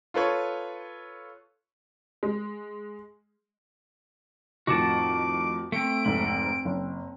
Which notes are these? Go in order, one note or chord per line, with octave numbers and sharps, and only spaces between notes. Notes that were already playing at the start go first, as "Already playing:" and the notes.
F4 A4 B4 C#5
G#3
F2 A2 D#3 F#4 F#5 A5 D6
A3 C4 D7
F1 G#2 F#7
C4
F#1